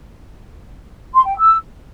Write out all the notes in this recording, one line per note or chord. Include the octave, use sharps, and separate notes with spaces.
C6
G5
E6